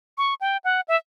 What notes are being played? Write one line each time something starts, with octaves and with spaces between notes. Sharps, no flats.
C#6
G5
F#5
E5